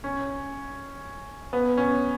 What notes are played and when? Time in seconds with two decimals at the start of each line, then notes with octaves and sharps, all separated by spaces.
0.04 C#4
1.53 B3
1.77 C#4